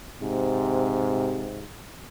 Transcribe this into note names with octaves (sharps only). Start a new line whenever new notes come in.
G#2 C3